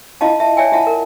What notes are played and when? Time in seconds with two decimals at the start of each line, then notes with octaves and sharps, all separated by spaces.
0.21 E4 F4 D#5 F5 A5
0.40 E5 A5
0.57 C#5 D5 E5 G5 G#5
0.72 E4 F4 E5 F#5 A5
0.87 A#4